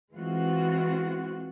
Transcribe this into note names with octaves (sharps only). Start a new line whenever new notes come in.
E3 G#3 C4 F4 F#4